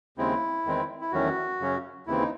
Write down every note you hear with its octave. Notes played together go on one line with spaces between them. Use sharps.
D#2 C#3 G#3 C4 E4
E2 D#3 G#3 C4
E4
E2 D#3 F#3 A3 C#4 F#4
F#2 C#3 F#3 C#4
D#2 C#3 E3 C4 E4
D#4